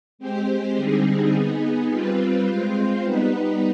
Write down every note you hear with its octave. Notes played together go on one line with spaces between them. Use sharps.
G#3 C4 G4 C5
D3 G3 C4 D#4 G#4
B3 D#4 G#4
G3 C4 F4 B4
G#3 C4 F4 C5
G3 B3 D#4 B4